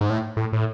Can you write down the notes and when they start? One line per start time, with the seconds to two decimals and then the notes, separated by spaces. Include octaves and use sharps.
0.01 G#2
0.10 A2
0.37 A2
0.53 A2